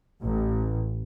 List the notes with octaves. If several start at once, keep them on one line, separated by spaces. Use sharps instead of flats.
A1